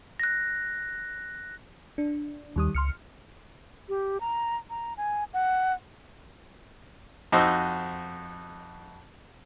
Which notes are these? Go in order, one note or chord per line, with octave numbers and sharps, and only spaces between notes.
F#6 A#6
D4
D#2 D#3 G3 D#6
C#2 C6 F6 C#7
G4
A#5
A#5
G#5
F#5
F2 D#4 F#4 C5 D#5 E6